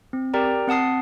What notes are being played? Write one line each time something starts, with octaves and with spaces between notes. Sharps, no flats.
C4
G4 A#4 D5 G5 A#5
C4 F#5 A5 D#6 C7